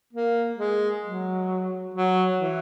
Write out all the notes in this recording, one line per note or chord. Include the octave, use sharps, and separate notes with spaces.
A#3
G#3
F#3
F#3
E3